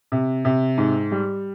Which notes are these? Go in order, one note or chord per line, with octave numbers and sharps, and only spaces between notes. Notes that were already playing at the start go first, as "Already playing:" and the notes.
C3
C3
G#2
G3